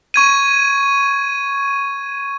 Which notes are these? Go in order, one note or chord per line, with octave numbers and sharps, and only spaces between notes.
C#6 G#6 D#7